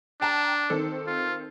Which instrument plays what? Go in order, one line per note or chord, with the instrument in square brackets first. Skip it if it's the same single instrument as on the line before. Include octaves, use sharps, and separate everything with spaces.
[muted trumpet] D4 [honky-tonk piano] G5 A5 A#5
[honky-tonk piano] D#3 C4 A4
[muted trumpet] F4